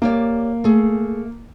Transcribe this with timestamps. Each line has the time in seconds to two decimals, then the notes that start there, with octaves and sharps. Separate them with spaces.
0.02 A#3 G4 C#5 D5
0.64 A3 G#4